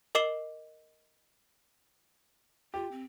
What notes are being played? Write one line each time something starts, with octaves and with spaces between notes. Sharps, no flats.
A#4 D#5 D6 C7 E7 G7
F4 G4
C4